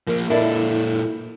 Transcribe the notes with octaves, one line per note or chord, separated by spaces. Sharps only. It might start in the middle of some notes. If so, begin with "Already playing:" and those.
F3 A#3 A#4
A#2 D4 E4 A4 A#4 D5 D#5